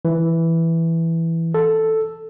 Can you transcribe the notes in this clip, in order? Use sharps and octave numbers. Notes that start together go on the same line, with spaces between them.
E3
A4